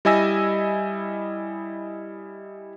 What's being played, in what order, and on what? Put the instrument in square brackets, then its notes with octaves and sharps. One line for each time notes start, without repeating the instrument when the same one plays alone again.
[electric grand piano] G3 E4 D#5 G#5 E6 A#6